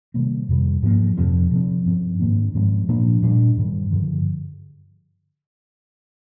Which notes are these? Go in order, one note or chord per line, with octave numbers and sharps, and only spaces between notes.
C3 D#3 G3 A#3
F2 C3 G3
G#2 F3 A#3
F2 C3 F3 C4
C3 F3 C4
G2 F3 C4
G#2 D#3 A#3 D4
G#2 F3 G#3 C4
A#2 F3 A#3 D4
A#2 G3 D4
G2 D#3 G3
G2 D3 F3